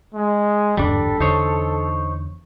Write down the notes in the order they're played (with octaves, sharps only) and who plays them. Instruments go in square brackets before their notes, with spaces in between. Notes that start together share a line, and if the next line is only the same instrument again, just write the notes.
[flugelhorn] G#3
[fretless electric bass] G1 E2 G#2 [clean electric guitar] G3 D4 [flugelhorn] A4
[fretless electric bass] E2 D3 [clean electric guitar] D#4 C5 C#5